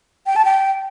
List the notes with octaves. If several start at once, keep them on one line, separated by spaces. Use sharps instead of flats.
G5
A5
G5